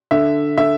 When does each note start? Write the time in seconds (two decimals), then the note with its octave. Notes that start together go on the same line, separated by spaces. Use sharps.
0.11 D3 E5
0.58 D3 E5